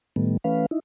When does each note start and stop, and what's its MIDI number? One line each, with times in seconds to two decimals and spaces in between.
0.16 0.37 45
0.16 0.37 51
0.16 0.37 55
0.16 0.37 57
0.16 0.37 59
0.44 0.66 52
0.44 0.66 57
0.44 0.66 61
0.44 0.66 71
0.44 0.66 77
0.71 0.80 63
0.71 0.80 64